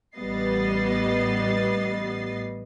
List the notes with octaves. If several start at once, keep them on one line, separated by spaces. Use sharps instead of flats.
A1 G3 B3 D#5 A6 C7